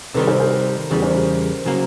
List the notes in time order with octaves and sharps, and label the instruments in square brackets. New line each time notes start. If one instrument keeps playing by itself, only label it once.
[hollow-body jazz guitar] C3 D#3 G3 [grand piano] A4 B4
[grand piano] A#4 C5
A#4 C5
[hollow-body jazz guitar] E2 C#3 E3 G3 [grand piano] G#4 A#4
[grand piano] A#4 C5
G#4 A#4
[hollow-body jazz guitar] C#3 F#3 A#3